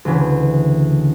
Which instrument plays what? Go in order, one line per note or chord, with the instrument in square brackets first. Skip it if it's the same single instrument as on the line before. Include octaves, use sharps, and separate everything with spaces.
[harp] D2 C#3 E3